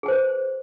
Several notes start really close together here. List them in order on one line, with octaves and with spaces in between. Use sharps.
G#4 G#5 C5 B4